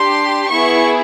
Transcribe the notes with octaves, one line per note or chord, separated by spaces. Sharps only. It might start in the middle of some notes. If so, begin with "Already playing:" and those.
Already playing: D4 G4 C6
B3 E4 G#4 C#6